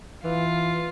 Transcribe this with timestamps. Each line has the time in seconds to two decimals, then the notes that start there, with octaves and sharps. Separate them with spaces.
0.24 E3 F4